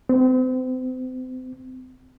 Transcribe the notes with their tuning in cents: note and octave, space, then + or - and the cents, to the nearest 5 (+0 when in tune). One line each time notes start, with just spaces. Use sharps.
C4 -35